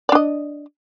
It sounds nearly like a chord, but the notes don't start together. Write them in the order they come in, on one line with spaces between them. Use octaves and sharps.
D5 D4 D#5